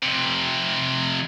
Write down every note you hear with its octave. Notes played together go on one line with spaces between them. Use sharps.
F2 C3